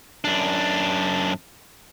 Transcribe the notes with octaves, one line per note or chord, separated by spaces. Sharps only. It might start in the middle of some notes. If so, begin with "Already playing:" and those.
F#2 D4